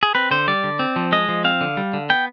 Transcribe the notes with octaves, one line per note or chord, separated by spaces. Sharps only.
G#4
C4 B4
D3 C5
G3 D5
D3
C4
F3
G#3 D#5
F3
C4 F5
D3
G3
D3
B3 G5